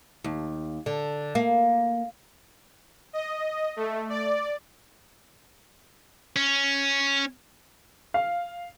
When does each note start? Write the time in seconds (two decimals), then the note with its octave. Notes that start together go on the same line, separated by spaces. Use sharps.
0.24 D#2
0.86 D3
1.35 A#3
3.13 D#5
3.76 A3
4.09 D5
6.36 C#4
8.14 F5